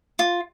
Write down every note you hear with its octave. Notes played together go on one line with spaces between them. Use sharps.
F4